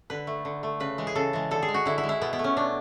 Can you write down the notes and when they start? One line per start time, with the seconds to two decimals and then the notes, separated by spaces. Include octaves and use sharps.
0.10 D3 B4
0.27 A3
0.45 D3
0.63 A3
0.80 C#3 B4
0.98 E3 G#3
1.07 G#4
1.15 C#3 A4
1.33 E3 G#3
1.51 D3 A4
1.63 G#4
1.68 G#3
1.74 F#4
1.86 D3 E4
1.98 E4
2.04 G#3
2.09 E4
2.21 B2 B3
2.33 B3
2.39 A3
2.44 C#4
2.57 B2 D4